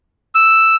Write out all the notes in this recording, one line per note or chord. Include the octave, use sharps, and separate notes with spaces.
E6